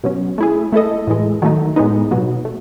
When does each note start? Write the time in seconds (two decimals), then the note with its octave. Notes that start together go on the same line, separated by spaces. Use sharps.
0.04 B2 F#3 C#4
0.38 A3 E4 G#4
0.72 A3 E4 A4 D#5
1.07 A2 E3 G#3
1.42 D#3 F#3 A3 D#4
1.76 A2 G#3 B3 D#4
2.11 B2 F#3 B3
2.45 A3